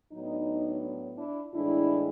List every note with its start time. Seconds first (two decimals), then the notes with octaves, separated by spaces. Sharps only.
0.12 A2 F#3 B3 D4 D#4
1.18 D4 E4
1.53 A2 E3 G#3 D4 E4